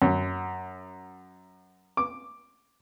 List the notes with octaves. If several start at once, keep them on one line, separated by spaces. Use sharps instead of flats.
F#2
D6